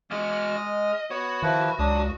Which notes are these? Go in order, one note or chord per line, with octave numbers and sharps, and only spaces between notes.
E2 G#3 F#4 F6
D#5
B3 F#4 C#5
D#3 F3 E4 B4
C#2 F#3 D4 D#6